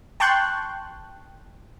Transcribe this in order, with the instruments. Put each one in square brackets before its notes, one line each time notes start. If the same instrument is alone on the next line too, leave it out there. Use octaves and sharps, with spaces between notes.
[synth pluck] G5 A5 C6 C#6 F#6 G6